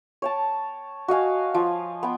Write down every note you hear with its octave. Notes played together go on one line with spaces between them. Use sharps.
C#5 G5 A5
F#4 D#5 F5 G#5
F3
B3 G5